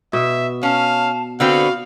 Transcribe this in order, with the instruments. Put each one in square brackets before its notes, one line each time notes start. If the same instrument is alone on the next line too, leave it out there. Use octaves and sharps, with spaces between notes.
[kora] B2 [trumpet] E5
[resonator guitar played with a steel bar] C#4 [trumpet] F5 [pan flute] A5
[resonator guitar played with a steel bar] D3 B3 C4 [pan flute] F#4 [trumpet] F5